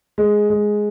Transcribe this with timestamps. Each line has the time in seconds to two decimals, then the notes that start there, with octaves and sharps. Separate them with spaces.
0.18 G#3
0.50 G#3